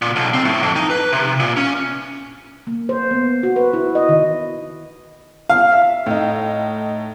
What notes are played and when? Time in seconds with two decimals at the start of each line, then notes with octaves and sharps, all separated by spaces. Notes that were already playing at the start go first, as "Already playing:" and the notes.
0.02 A#2
0.16 B1
0.34 C4
0.45 A2
0.63 F2
0.76 D#4
0.90 B4
1.12 C3
1.40 A#2
1.57 C#4
2.67 A#3
2.89 C5
3.11 B3
3.43 F#4
3.56 B4
3.74 E4
3.95 D#5
4.09 D#3
5.50 F5
5.72 E5
6.06 A2 D#4